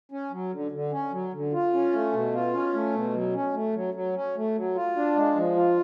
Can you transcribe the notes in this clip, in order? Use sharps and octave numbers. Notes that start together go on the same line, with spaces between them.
C#4
F#3
D3
D3
C#4
F#3
D3
F4
C#4
A3
B2
F4
C#4
A3
B2
F#3
C#4
A3
F#3
F#3
C#4
A3
F#3
F4
D4
G#3
F3
F4